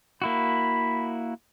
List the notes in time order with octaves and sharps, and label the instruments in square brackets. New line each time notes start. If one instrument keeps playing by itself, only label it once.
[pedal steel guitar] A#3 E4 F#4 [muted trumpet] B5